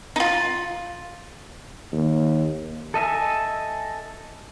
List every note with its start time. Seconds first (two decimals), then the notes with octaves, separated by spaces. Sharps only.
0.16 D#4 F4
1.92 D#2
2.94 A4 D#5 E5 G#5